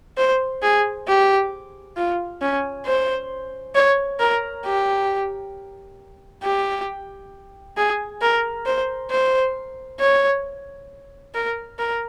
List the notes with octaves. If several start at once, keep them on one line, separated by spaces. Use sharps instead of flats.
C5
G#4
G4
F4
C#4
C5
C#5
A#4
G4
G4
G#4
A#4
C5
C5
C#5
A#4
A#4